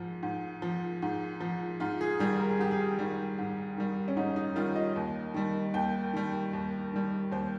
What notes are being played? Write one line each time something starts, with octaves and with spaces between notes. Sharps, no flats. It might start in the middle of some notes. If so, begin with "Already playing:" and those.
Already playing: G#2 F3
G#2
F3
G#2
F3
G#2 F4
G#4
D#3 G3 G#4
A#4
G#4
G#2 G4
G#4
D#3 G3
G#2
D#3 G3
C#4
G#2 D#4
D#4
D#3 G3 F4
D#5
D#2
D#3 G3
D#2 G5
D#3 G3
D#2
D#3 G3
D#2 C5